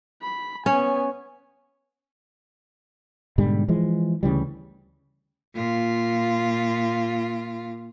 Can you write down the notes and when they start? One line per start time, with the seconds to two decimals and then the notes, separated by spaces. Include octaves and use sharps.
0.23 B5
0.66 B3 C#4 G#5
3.38 G#2 B2 D3 G3
3.68 E3 F3 G#3
4.23 D2 C#3 E3 G3
5.55 A#2 F4